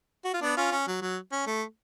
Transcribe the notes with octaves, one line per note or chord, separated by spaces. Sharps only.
F#4
F4
B3 D4
C#4 F4
C#4
F#3
F#3
C#4
A3